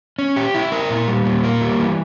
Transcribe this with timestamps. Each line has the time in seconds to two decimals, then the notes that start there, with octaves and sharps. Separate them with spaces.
0.19 C#4
0.36 G4
0.55 E4
0.72 A#4
0.90 A#2
1.08 G3
1.25 A#2
1.44 A#3
1.61 G3
1.79 E3